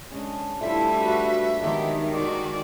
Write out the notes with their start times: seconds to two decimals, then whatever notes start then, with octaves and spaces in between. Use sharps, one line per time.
0.12 G#3 C#4 D4
0.61 D3 F3 G3 A3 E4 A4 E5
1.01 F#4 B4
1.61 D#3 F#3 G#3 B3 G4
2.14 F#4 G#4 C5 D5 F5